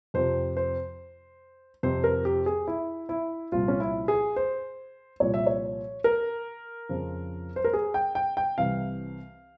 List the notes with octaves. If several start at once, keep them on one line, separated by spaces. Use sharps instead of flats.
F2 C3 F3 C5
C5
F2 C3 F3 C5
A#4
G4
G#4
E4
E4
C2 A#2 F3 F4
C#4
E4
G#4
C5
C2 A#2 F3 C#5
E5
C#5
A#4
F2 C#3 F3
C5
A#4
G#4
G5
G5
G5
C2 C3 E3 F5